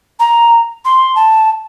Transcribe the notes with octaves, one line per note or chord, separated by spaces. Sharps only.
A#5
C6
A5